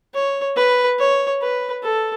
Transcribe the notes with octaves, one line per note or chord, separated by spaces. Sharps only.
C#5
B4
C#5
B4
A4